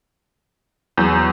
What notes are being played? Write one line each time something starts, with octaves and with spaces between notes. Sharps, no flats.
E2 F#3 G6